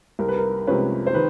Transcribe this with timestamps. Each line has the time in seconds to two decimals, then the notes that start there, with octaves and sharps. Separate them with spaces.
0.19 C2 A#4
0.28 B4
0.38 A#4
0.67 C3 F3 G#3 C#4 B4
1.07 C5
1.14 D#3 B4